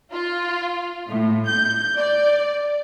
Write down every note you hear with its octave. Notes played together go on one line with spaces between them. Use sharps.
F4
A2
G6
D5